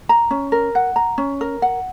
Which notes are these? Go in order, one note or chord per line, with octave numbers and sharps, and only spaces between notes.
A#5
C#4
A#4
F#5
A#5
C#4
A#4
F#5